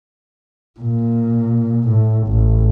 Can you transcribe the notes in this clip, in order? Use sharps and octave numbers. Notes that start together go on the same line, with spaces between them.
A#2
A2
A1